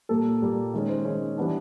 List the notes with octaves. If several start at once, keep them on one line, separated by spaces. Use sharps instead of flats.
A#2 G3 A#3 A4
A#2 G3 A#3
D#3 G#3 C#4
C5
D#3 G#3 C#4
E3 G3 B3 D4